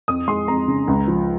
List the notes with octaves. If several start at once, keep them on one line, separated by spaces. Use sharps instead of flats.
F2 D#6
G#3 C6
F2 A#5
C#3
C#2
F3